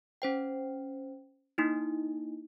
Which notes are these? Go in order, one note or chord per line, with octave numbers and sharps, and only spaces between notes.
C#4 C5 G5
A#3 D#4 E4